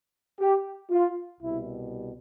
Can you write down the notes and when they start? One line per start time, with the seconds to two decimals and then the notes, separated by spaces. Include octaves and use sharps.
0.39 G4
0.90 F4
1.40 C2 B2 G3 E4